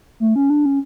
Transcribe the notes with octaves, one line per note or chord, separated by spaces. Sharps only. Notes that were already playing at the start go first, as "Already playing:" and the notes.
A3
C#4
D4
C#4